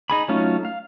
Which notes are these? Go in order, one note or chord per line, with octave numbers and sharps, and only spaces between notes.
D#4 G#4 B5
F#3 A3 C#4 D#4 F4
F5